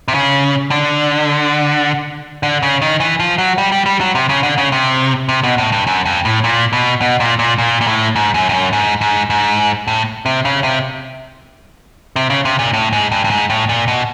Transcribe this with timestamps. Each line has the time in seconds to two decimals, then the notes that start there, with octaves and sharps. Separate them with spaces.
0.08 C3
0.14 C#3
0.71 D3
2.43 D3
2.62 C#3
2.82 D#3
3.00 E3
3.20 F3
3.38 F#3
3.58 G3
3.72 G3
3.86 G3
4.01 F#3
4.15 C3
4.29 C#3
4.43 D3
4.58 C#3
4.72 C3
5.29 C3
5.43 B2
5.58 A2
5.72 G2
5.87 F#2
6.05 F2
6.25 A2
6.44 A#2
6.73 B2
7.02 B2
7.20 A#2
7.39 A#2
7.58 A#2
7.81 A#2
7.87 A2
8.16 G#2
8.34 F#2
8.49 F2
8.54 F#2
8.73 G#2
9.01 G#2
9.30 G#2
9.87 A2
10.26 C3
10.45 C#3
10.64 C3
12.16 C3
12.30 C#3
12.45 C3
12.59 A#2
12.73 A2
12.93 G#2
13.12 G2
13.24 G2
13.30 G#2
13.50 A2
13.69 A#2
13.88 B2